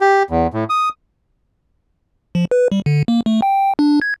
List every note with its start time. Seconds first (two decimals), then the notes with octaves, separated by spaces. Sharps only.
0.01 G4
0.30 E2
0.53 A2
0.70 D#6
2.35 F3
2.51 B4
2.72 G3
2.86 D3
3.08 A#3
3.26 A3
3.42 G5
3.79 D4
4.02 G#6